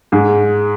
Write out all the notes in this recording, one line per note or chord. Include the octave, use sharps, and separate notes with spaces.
G#2 G#4